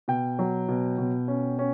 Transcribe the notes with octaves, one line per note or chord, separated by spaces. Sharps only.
B2 G5
F#3
B2
B2
C#4
C#4